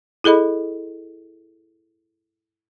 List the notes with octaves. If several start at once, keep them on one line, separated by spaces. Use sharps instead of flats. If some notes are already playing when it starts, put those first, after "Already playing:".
E4 G#4 A4 D#5 B5